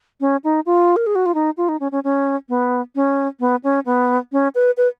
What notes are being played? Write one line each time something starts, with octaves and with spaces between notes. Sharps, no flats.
C#4
D#4
F4
A#4
G#4
F#4
F4
D#4
F4
D#4
C#4
C#4
C#4
B3
C#4
B3
C#4
B3
C#4
B4
B4